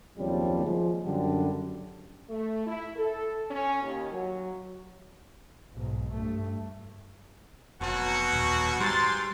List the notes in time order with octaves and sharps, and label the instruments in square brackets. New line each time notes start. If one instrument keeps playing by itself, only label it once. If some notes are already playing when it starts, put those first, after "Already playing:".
[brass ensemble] F#1 D#2 F3 G3 C4 C#5
F3 G#3
F#2 D3 G3
[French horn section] A3
E4
A4
C#4
D#2
F#3
[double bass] B1 G#2
G2 A3
[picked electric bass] F1 [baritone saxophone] B2 [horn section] F#3 F#4
[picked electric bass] D#1
[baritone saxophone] G#2 [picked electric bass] G3 [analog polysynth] C6 A6